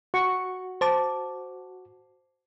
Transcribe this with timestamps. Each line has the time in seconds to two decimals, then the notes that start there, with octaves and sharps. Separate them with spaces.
0.14 F#4 C#6
0.81 C5 A5 D6